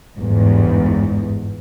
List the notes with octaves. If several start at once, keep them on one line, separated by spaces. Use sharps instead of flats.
G1 E2 G#2